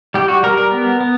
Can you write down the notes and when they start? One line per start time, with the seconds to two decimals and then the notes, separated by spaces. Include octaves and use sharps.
0.14 G3 G4
0.28 F#4
0.43 G3 A#4
0.57 A#4
0.71 B3
1.00 B3